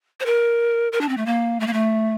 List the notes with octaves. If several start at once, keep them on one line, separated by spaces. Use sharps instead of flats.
C5
A#4
A#4
D4
C4
A3
A#3
A3
A#3
A3